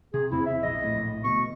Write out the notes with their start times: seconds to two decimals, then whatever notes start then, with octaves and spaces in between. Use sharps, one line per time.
0.14 C3 G#4
0.31 E2 C3 C4 E4
0.46 E5
0.63 A#1 D#5
0.79 D1 A#1 A2
1.24 D2 B2 C#6